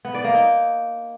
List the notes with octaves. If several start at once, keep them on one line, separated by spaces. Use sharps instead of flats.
B3
D5
A#3
D#4